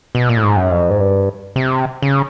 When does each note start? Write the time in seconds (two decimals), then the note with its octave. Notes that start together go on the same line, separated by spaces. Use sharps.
0.15 B2
0.29 A#2
0.37 A2
0.43 G#2
0.56 F#2
0.71 F2
0.90 G#2
1.00 G2
1.56 C3
2.02 C#3